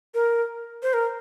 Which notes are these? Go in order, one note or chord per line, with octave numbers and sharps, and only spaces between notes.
A#4
C5
A#4